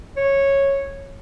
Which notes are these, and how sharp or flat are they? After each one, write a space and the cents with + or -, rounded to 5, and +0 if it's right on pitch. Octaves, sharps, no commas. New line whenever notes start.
C#5 -10